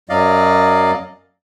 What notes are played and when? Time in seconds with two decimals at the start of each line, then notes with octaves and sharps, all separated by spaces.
0.09 F#2 F#3 D5 D#5 F5